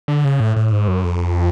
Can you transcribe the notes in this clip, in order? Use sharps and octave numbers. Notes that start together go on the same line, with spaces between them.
D3
C#3
A2
A2
G#2
F#2
F2